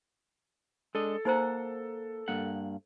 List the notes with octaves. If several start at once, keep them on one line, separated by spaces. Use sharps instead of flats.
G#3 D4 A4 D#5
A#3 D#4 C5 F#5 A#5
G2 A#3 F#5